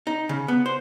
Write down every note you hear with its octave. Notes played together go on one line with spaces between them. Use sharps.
D#4
C#3
B3
C5